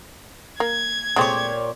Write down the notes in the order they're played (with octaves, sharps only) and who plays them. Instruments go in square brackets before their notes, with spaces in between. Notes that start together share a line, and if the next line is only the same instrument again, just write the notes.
[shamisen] A#3 [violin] G#6
[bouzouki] A#2 G4 C#5 [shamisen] G#3 A3 C4